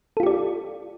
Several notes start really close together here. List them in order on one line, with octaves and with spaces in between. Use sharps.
A4 F4 G4 D5